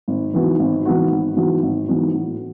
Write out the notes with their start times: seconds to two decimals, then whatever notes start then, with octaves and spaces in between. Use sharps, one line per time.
0.08 G#1
0.33 G#2 E3 B3 F#4
0.59 G#1
0.85 G#2 E3 B3 F#4
1.12 G#1
1.37 G#2 E3 B3 F#4
1.63 G#1
1.89 G#2 E3 B3 F#4
2.14 A2